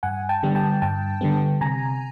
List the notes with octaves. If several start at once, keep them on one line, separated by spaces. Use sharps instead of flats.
G2 F#5 G#5
G5 A5
D3 G3 B3
G5 A5
G2 G5 A5
D3 G3 B3
C3 G#5 A#5